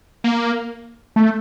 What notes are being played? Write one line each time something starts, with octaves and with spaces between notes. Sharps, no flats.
A#3
A3